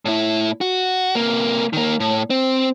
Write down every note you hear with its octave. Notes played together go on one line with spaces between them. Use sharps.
A2 E4
F#4
C3 A#3
D#3 A#3
A2
C4